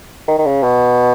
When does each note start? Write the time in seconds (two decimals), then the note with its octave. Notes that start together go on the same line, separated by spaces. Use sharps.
0.28 D#3
0.39 D#3
0.46 C#3
0.63 B2